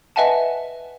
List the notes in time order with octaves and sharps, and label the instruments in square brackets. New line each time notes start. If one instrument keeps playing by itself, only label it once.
[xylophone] B4 D#5 E5 F#5 G#5 A5